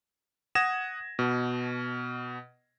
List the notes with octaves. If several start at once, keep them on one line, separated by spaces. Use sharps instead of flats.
F#5 D#6 G#6 A#6 E7
B2